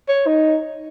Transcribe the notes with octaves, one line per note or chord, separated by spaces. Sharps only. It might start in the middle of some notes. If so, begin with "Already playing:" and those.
C#5
D#4